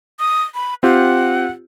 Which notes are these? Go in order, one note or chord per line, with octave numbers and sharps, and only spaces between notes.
D#6
B5
C4 F4 G4 F#5